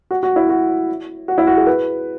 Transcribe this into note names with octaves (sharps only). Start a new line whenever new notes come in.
F#4
F#4
E4
F#4
F#4
E4
F#4
G#4
B4